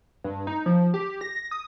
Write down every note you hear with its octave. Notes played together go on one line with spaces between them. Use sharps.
G2
D#4
F3
G4
A#6
D#6